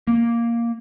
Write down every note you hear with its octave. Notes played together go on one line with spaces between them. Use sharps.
A#3